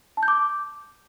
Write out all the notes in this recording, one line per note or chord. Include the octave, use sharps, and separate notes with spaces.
A5
G6
D6